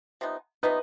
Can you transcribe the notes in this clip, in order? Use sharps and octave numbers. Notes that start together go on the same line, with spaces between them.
C3 F3 B3 D#4
C3 F3 B3 D#4 B4